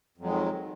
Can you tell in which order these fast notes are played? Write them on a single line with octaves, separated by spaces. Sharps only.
F2 F#3 G#3 D#3